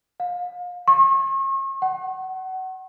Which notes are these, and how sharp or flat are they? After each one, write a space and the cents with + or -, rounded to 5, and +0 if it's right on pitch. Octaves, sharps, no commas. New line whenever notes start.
F5 +30
C#6 -40
F#5 +25